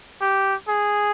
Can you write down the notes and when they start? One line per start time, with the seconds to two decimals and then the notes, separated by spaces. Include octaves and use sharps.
0.22 G4
0.68 G#4